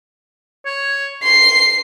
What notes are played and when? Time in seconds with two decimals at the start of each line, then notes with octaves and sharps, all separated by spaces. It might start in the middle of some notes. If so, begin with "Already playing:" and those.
0.66 C#5
1.24 C6 C7